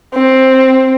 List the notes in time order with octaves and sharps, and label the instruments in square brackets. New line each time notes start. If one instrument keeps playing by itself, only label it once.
[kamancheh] C4